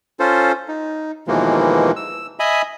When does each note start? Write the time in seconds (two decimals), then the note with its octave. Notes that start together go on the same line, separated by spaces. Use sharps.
0.20 C#4 F4 A4 C5
0.68 D#4
1.28 D#2 B2 E3 F3 G#3 A#3
1.96 E6
2.39 D#5 E5 G#5 B5 D#6